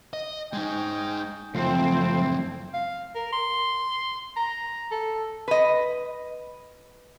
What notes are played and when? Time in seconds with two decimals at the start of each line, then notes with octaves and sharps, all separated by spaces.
0.13 D#5
0.53 G#3 C#4 D#4 D#5 G5
1.55 C#2 F#2 F3 A3 C4 E4 C5
2.74 F5
3.15 A#4
3.33 C6
4.37 A#5
4.91 A4
5.48 B4 D#5